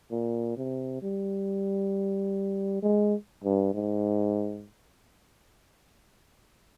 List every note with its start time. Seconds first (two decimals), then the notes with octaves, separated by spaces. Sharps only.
0.11 A#2
0.57 C3
1.02 G3
2.83 G#3
3.44 G2
3.74 G#2